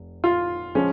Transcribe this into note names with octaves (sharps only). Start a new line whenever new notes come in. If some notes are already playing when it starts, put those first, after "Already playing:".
Already playing: F1
F4
F3 G#3 C#4